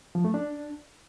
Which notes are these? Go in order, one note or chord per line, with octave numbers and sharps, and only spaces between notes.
F3
A3
D4